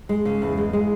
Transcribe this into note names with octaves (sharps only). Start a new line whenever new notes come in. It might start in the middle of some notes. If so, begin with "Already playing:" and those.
G#3
C#3
E2
G#3
G#3